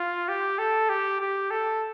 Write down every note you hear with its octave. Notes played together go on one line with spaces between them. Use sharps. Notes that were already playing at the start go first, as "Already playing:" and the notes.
Already playing: F4
G4
A4
G4
G4
A4